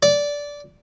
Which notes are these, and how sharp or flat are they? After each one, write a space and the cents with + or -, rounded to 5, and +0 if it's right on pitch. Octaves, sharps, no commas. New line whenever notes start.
D5 -15